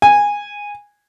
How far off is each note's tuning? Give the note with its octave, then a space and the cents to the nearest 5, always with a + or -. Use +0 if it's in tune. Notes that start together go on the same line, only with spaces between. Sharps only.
G#5 -15